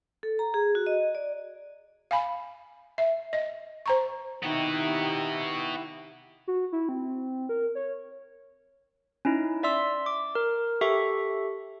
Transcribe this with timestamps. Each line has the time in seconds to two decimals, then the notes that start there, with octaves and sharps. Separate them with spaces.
0.23 A4
0.39 A#5
0.54 G#4
0.75 F#4
0.86 D#5
1.15 D5
2.11 F5 G#5 B5
2.98 E5
3.33 D#5
3.86 C5 A#5 C#6
4.43 C3 D#3 B3 D#4 E4 F#4 G4
6.47 F#4
6.72 E4
6.89 C4
7.49 A#4
7.75 C#5
9.25 C#4 D#4 E4
9.63 D5 E5 C6 E6
10.06 D6
10.35 A#4
10.81 G4 A4 E5 C#6